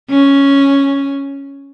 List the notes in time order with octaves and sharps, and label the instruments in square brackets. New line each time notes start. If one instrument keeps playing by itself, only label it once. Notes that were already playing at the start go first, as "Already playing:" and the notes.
[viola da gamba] C#4